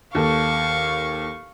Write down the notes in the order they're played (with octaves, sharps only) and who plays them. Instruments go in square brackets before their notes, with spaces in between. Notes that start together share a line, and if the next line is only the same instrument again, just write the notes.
[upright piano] D#2 A4 [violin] F5 C#6